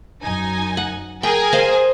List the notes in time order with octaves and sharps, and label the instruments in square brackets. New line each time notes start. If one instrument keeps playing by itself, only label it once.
[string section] F#2 D#4 G#5
[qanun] F#5
[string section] G#4 A#4 G#5 [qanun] G5
[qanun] C5 D#5 F5